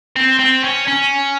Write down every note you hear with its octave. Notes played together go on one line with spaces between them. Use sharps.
C4
C4
C#4
C#4